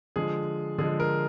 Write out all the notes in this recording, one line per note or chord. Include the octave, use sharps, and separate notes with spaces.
D3 F3 G#3 G#4
D3 F3 G#3 G#4
A#4